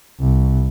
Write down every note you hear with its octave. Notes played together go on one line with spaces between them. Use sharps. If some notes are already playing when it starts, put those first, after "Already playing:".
C2